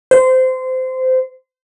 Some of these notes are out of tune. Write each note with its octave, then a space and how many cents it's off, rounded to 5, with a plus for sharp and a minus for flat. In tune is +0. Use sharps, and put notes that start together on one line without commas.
C5 -20